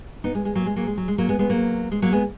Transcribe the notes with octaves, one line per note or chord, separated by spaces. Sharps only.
B3 D#4
G#3
G#3
F#3 A#3
G#3
F#3 A#3
G#3
F#3
G#3
F#3 A#3
G#3 B3
G#3 B3
F#3 A#3
G#3
F#3 A#3
G#3 B3